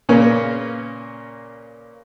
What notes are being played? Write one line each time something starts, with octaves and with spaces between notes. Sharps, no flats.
A#2 C#3 A#3 B3 C#4